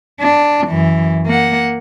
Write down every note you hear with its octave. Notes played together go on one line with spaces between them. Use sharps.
D4
F#2 E3
A#3 F#5